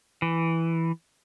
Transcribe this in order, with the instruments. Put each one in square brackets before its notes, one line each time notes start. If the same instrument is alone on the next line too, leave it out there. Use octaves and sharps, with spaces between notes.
[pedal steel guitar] E3